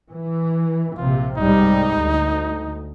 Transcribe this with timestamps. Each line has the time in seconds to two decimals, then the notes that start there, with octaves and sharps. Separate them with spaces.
0.11 E3
0.97 A#1 C3 F4
1.38 C2 G#2 G3 D#4
1.97 D2